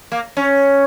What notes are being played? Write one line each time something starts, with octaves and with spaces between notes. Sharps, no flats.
A#3
C#4